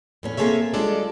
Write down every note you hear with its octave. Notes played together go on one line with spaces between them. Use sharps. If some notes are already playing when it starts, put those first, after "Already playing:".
E2 A2 C#4
A#3 C4 G#4 A4 C#5 E5
G3 G#3 D4 F4 A4 D5